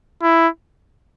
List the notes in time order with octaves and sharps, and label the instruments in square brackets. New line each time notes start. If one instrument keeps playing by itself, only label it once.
[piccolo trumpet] E4